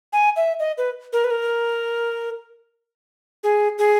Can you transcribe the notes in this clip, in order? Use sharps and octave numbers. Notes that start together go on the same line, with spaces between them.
G#5
E5
D#5
B4
A#4
B4
A#4
G#4
G#4